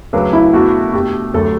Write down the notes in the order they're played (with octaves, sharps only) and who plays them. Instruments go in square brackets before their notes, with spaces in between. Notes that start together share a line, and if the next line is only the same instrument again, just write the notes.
[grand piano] C#2 C#3 F#3 A3 D4 [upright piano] B4
[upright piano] E4
[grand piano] B2 A3 D4 [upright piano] F#4
[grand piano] B2 A3 D4 [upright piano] G4
[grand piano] D2 D3 F#3 A3 [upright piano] A4